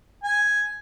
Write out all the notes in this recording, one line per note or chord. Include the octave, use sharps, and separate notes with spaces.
G#5